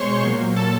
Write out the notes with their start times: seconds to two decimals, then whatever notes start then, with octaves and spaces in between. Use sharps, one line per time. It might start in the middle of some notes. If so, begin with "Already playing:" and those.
Already playing: B2 G#3 C5 C#5 C6 C#6
0.24 A#2 F#3 A#3
0.56 A4 A5